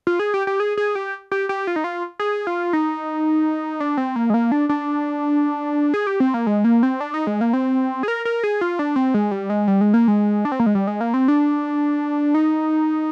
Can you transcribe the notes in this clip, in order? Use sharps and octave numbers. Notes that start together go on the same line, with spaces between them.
F4
G#4
G4
G4
G#4
G#4
G4
G4
G4
F4
D#4
F4
G#4
F4
D#4
D4
C4
A#3
G#3
A#3
D4
D4
G#4
G4
C4
A#3
G#3
A#3
C4
D4
D#4
G#3
A#3
C4
G#4
A#4
A#4
G#4
F4
D4
C4
G#3
G3
G#3
G3
G#3
A#3
G#3
D4
C4
A#3
G#3
G3
G#3
A#3
C4
D4
D#4